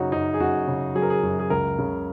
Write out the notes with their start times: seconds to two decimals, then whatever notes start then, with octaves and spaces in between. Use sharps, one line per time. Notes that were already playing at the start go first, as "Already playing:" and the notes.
Already playing: F#2 C#3 F#3 C#4 D#4 F#4
0.12 F#2 D#4
0.34 G#4
0.40 F#2 F#4
0.67 C#3
0.95 F#3 G#4
1.02 A#4
1.10 G#4
1.23 F#2
1.39 G#4
1.50 C#2 A#4
1.78 C#3